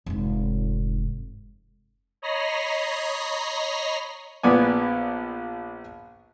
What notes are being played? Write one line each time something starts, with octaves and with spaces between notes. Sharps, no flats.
F1 G#2
C#5 D#5 A#5 B5 A#6 C7
A#1 B3 D5 G#5